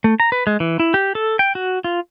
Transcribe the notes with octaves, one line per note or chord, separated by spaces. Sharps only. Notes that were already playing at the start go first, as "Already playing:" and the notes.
A3
A#5
B4
G#3
E3
E4
G4
A4
G5
F#4
F4